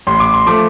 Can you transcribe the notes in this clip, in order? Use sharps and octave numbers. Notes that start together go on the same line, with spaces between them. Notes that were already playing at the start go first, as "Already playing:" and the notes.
A1 C6
D6
C6
F3 A3 D6